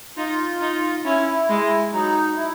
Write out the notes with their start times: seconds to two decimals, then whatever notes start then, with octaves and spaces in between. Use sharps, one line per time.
0.17 D#4 F4
0.61 D#4
1.04 C#4 E4
1.49 G#3
1.93 F#3 D#4
2.36 E4